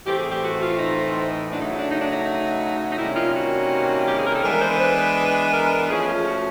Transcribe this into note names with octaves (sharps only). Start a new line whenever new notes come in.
A2 E3 A3 C4 G4
G#4
G4
F#4
F4
D#4
C#3 F#3 A3 D4
D#4
E4
D4
D#4
D4
D#4
D#4
D#4
C3 D#3 G3 A#3 C#4 E4
F4
F#4
G4
G#4
A#4
A4
E3 G#3 B3 D4 A#4
C5
B4
A#4
A#4
F3 A3 C#4 G#4
F4
F#4